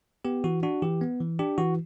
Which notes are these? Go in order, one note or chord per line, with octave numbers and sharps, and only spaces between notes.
B3 G4
E3 F#4
D4 F#4
E3 G4
B3
E3
D4 G4
E3 F#4